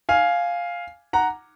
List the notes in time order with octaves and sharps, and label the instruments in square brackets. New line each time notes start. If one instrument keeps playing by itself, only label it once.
[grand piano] F5 G#5
F#5 A#5